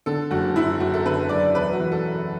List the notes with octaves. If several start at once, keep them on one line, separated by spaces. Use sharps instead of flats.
D3 A4
F#1 F#4
F#2 E4
F#1 F#4
A4
D3 B4
F#2 D5
E1 B4
F#4
E3
A4